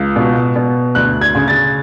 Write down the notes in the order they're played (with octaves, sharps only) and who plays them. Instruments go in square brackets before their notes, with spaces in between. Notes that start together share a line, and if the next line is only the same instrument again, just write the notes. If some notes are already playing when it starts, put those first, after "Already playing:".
Already playing: [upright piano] C#2
B2
B2
D2 F#6
G#6
C#3
A6